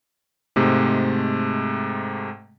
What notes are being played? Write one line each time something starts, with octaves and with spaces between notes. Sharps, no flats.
G#2 C3 G#3 A3